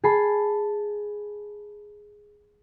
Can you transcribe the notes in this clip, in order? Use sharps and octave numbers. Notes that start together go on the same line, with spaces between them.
G#4 A5 B5 C7